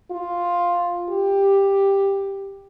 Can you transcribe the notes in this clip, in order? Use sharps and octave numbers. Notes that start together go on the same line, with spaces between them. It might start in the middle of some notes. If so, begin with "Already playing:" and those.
F4
G4